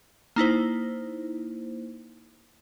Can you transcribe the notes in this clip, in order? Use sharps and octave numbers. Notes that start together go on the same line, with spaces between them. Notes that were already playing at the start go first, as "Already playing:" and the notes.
A#3 D#4 E4 C5